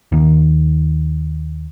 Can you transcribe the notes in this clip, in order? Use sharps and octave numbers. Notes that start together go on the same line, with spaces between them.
D#2 D#3